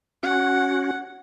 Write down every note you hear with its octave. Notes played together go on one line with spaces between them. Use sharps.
C#4 F#4 F#5